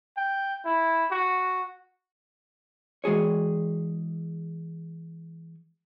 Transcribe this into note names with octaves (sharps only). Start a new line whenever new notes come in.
G5
E4
F#4
E3 G#3 F#4 G#4 C#5